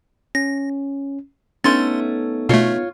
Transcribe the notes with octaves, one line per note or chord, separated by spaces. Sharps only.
C#4 A#6
A3 B3 C#4 D#4 A4 C6 A6
B2 A3 F4 C#5